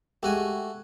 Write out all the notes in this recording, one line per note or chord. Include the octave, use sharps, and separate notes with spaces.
G#3 A3 F#4 G4 G#5